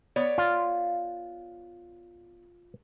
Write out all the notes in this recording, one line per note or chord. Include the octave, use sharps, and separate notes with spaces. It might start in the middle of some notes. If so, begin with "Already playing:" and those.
B3 C#5 D5
F4